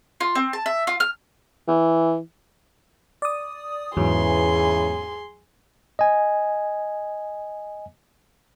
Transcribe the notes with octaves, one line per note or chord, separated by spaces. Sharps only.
F4
C4
A5
E5
F4
F6
E3
D5 D#6
E2 G#2 C#3 E3 F#3 G#4 C6
D#5 G#5